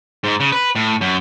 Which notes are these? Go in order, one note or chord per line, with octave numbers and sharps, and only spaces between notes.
G#2
C#3
B4
A2
F#2